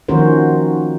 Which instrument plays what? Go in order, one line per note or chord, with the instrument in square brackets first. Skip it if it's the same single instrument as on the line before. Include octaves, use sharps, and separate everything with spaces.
[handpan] D#3 F3 C#4 F#4 A#4 C5